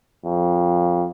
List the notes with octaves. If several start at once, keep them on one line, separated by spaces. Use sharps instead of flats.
F2